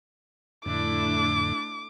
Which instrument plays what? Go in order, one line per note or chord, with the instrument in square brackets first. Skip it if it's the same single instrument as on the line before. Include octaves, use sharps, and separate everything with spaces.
[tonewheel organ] F2 A2 D3 [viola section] A3 D4 E4 [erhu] D6